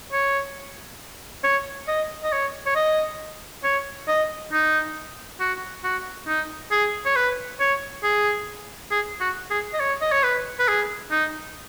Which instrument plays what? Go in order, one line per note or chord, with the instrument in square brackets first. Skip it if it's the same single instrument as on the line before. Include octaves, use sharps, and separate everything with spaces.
[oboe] C#5
C#5
D#5
D#5
C#5
C#5
D#5
C#5
D#5
D#4
F#4
F#4
D#4
G#4
C#5
B4
C#5
G#4
G#4
F#4
G#4
D#5
C#5
D#5
C#5
B4
B4
G#4
D#4